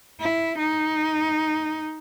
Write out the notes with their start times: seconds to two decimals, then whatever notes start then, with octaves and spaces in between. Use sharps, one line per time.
0.20 E4
0.58 D#4